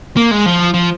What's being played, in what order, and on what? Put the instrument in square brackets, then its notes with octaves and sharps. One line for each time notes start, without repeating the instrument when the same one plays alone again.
[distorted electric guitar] A#3
G#3
F3
F3